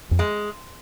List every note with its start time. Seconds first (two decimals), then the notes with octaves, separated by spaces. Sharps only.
0.11 F2
0.19 G#3